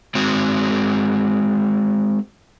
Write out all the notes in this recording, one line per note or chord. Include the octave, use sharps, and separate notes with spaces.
G#3 C4 F#4